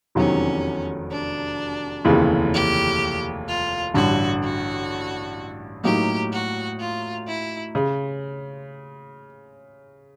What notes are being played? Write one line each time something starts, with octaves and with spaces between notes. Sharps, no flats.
F1 E2 C3 D#3 F#3 C#4
D4
F1 D#2 C#3 E3
G4
F4
A1 G2 D3 F#4
F#4
A2 F#3 A#3 D#4 G4
F#4
F4
E4
C#3